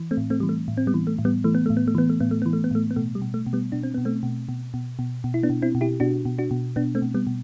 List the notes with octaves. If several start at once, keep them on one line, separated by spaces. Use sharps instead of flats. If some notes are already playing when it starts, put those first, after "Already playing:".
Already playing: E3
A3 C4
A2
A3 C4
E3 G3
A3
A2
C4
G3 B3
E3
A3
A2
G3 B3
E3 A3
B3
A2 A3
B3
A3
E3 B3
A3
A2 B3
A3
E3 B3
A3
B3
A2 A3
B3
B2 A3
G3
B2
A3
B2
G3 B3
B2 D4
C4
B2 B3
A3 C4
B2
B2
B2
B2
B2
E4
B3 D4
B2
C4 E4
B2
E4 G4
B2 D4 F#4
B2
D4 F#4
B2
B2 B3 D4
A3 C4
B2
G3 B3
B2